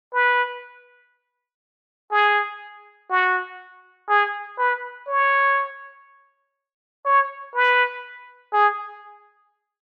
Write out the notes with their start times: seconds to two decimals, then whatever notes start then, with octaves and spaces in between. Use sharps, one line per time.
0.13 B4
2.11 G#4
3.09 F#4
4.09 G#4
4.58 B4
5.07 C#5
7.05 C#5
7.55 B4
8.53 G#4